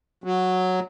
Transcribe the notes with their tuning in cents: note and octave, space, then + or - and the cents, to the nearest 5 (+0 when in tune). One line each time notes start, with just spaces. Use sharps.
F#3 -5